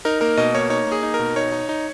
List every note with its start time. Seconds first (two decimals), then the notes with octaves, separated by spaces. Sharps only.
0.05 D#4 A#4
0.21 A#3 A#4
0.37 B2 D#5
0.54 A#3 C#5
0.70 D#4 C#5
0.87 A#3 G#4
1.03 D#4
1.14 A#4
1.19 B2
1.36 D#4 C#5
1.52 D#4
1.69 D#4